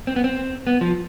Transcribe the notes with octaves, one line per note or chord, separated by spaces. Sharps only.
C4
B3
C4
B3
F3